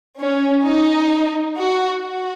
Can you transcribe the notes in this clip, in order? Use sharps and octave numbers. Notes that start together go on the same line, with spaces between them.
C#4
D#4
F#4
F#4